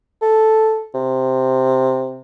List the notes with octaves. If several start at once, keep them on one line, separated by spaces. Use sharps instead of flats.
A4
C3